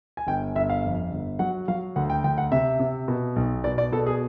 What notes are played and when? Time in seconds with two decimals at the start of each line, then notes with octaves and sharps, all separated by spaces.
0.17 G#5
0.27 G1 G5
0.55 G1 E5
0.69 F5
0.84 F2
1.12 G1
1.39 F#3 F#5
1.68 F#3 F5
1.96 D2 F#5
2.10 G5
2.24 D2 G5
2.38 F#5
2.52 C3 E5
2.80 C3
3.08 B2
3.36 B1
3.64 B2 D5
3.78 D5
3.92 B2 A4
4.07 G#4